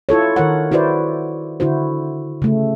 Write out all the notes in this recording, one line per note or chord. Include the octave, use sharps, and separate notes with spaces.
E4 F4 A4 C#5
D#3 A#4 C#5 F#5
E4 F#4 B4 C5 D5
D3 E4 F#4 C5
C#3 A3